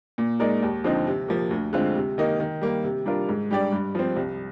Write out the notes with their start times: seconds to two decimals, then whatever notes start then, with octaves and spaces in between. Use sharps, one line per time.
0.18 A#2
0.40 G#3 D#4 A#4 D5
0.63 D#2
0.84 D3 F3 C4 D#4
1.07 C3
1.28 F3 A#3
1.51 D2
1.73 D3 G#3 C4 F4
1.95 C3
2.18 D#3 A#3 D#4
2.40 D#3
2.61 G3 A#3
2.84 C3
3.05 G3 D4 F4 A#4
3.29 G#2
3.51 G3 D4 G4 D5
3.72 G2
3.95 F3 C4
4.16 C2